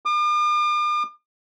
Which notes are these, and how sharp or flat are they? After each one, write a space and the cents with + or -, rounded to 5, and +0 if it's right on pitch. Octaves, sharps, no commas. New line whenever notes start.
D6 +45